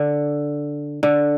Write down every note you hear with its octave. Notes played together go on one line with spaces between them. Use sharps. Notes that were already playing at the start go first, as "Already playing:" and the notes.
Already playing: D3
D3